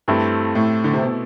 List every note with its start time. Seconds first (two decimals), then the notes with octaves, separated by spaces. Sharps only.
0.08 G2 A3 C4 E4 G4
0.55 A2
0.84 D3
0.93 C3
1.02 B2